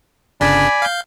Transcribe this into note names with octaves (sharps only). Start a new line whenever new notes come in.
G1 C#3 D4 D5 G#5 B5
F5 G6